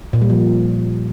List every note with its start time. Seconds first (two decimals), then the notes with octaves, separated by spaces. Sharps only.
0.13 A#2
0.22 G3
0.30 F3